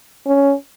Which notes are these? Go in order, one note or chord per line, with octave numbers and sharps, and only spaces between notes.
C#4